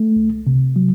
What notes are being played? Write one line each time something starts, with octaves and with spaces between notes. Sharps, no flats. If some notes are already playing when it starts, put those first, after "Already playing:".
Already playing: A3
C2
C3
F#3